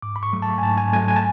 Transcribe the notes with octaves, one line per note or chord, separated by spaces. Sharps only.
G#2 D6
B5
C#6
F#3 A3
A5
G#5
G#2 A5
G#5
F#3 A3 G#5
G#5
A5